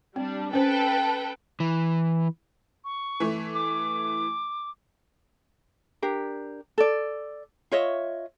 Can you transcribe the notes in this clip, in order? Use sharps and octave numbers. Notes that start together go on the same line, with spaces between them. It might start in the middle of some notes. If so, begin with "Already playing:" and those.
G3 C4 D4
C#4 A4 B4 C5 G5
E3
C#6
E3 A3
D6
D4 G4 A#4
A4 D5
F4 C#5 D#5 E5